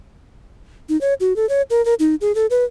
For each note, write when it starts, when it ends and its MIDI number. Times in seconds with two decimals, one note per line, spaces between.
0.89 0.99 63
1.01 1.14 73
1.20 1.36 66
1.36 1.48 69
1.49 1.62 73
1.70 1.84 70
1.85 1.94 70
1.99 2.15 63
2.21 2.35 68
2.35 2.46 69
2.50 2.64 71